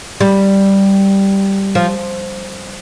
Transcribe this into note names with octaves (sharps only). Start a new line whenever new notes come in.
G3
F3